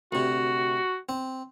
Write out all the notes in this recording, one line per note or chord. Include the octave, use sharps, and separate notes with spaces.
D2 C3 F#4
C4